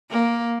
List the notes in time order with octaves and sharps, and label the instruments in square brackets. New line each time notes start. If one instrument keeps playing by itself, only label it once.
[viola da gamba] A#3